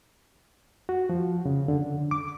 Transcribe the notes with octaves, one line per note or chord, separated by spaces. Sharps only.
F#4
F3
C#3
D3
D6